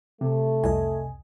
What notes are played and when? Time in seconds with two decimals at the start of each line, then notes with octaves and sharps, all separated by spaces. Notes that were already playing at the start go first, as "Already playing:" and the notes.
0.21 C3 A3
0.64 C2 F2 D#5 G#5